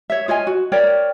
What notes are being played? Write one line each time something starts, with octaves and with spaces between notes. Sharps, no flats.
C#5 E5
F4 C#5 D#5 G#5
F#4
A#4 C#5 D5 G5